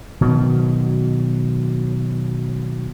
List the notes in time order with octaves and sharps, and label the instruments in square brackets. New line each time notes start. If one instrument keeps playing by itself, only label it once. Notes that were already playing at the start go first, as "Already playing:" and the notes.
[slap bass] B2 D#3 F#3